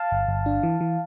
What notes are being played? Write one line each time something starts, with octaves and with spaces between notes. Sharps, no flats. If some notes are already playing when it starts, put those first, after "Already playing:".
Already playing: F5 A5
G1
G1
D4
E3
E3